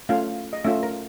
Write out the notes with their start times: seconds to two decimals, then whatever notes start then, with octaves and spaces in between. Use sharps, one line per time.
0.09 A3 C#4 F4 F5
0.53 D#5
0.64 A3 C#4 F4 E5
0.83 A#4